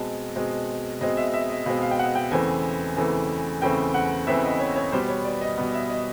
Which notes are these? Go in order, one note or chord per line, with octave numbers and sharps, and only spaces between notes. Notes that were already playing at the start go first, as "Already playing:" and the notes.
Already playing: B2 G#3 C4 A5
B2 G#3 C4
B2 G#3 C4 D#5
E5
E5
D#5
B2 G#3 C4 F5
F5
G5
F#5
G5
E2 C#3 E3 A3 C4 G#5
E2 C#3 E3 A3 C4
E2 C#3 E3 A3 C4 G5
F#5
E2 C#3 E3 A3 C4 E5
D#5
C#5
C#5
B2 G3 B3 C5
C#5
D5
D#5
B2 G3 B3
E5
D#5